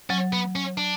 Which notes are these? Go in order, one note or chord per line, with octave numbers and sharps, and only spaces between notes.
F#3 C#4
B3
C#4
D4